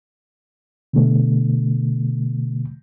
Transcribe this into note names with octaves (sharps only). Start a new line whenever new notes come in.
B2 D3 A3